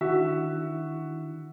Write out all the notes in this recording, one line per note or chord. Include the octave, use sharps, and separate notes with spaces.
D#3 D4 E4 F#4 E5